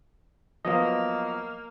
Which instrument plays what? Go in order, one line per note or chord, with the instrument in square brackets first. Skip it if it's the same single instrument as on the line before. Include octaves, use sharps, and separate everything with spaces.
[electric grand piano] F3 F#3 B3 [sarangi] A#3 [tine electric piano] D#5 F5